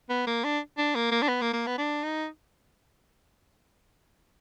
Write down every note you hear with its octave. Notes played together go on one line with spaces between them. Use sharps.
B3
A#3
D4
D4
A#3
A#3
D4
B3
A#3
A#3
B3
D4
D#4